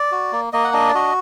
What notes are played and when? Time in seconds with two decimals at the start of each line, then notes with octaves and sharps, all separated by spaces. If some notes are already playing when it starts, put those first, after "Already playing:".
Already playing: D5
0.12 F#4
0.32 A#3
0.53 A#3 D#5
0.64 F#5
0.73 D4 D#5
0.89 D5
0.95 F#4 D#5